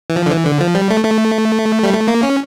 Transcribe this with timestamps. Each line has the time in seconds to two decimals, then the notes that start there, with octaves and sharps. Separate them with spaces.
0.10 E3
0.16 F3
0.26 D3
0.30 E3
0.45 D3
0.61 F3
0.75 G3
0.90 A3
1.04 A3
1.83 G3
1.94 A3
2.08 A#3
2.23 C#4